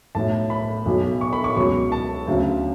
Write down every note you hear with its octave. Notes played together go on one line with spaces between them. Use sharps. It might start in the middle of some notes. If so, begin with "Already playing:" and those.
B1 A2 F#3 A5
B5
B1 B2 F#3
C#6
B5
C#6
C#2 B2 F#3 C#6
A5
D2 C#3 F#3